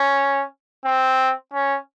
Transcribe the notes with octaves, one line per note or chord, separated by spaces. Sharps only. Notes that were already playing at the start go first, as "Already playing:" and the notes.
Already playing: C#4
C4
C#4